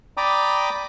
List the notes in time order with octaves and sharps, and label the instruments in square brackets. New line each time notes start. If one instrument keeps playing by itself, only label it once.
[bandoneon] D5 G5 A#5 B5 D6 D#6